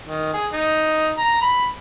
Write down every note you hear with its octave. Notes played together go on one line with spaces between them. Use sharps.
D#3
G#4
D#4
A#5
B5